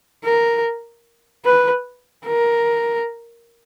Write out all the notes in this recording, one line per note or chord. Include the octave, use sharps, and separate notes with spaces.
A#4
B4
A#4